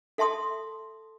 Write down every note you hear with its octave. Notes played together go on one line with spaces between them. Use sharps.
A4 E5 A5 C6 D#6